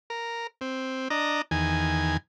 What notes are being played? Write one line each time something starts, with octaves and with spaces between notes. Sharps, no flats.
A#4
C4
D4 D#5 A#5
E2 D#3 G#5